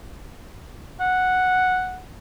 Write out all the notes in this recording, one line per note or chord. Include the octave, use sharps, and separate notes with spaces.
F#5